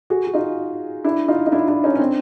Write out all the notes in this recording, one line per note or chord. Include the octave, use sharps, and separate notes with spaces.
F#4 G#4
F#4
D#4 F4
D4 E4
D#4 F4
D#4
D4 E4
D4 E4
C#4 D#4
C#4
C4 D4